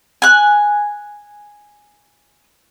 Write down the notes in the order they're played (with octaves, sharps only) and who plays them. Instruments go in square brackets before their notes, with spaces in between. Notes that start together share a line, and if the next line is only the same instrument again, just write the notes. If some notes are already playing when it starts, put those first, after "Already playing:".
[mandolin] G#5 F#6